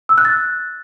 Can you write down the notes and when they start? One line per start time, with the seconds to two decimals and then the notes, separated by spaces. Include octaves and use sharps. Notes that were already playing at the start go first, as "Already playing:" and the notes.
0.09 E6
0.18 F#6
0.25 A6